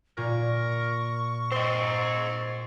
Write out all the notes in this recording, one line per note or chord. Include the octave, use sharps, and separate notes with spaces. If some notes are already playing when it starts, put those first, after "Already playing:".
A#2 A#4 C#6
C4 C5 D#5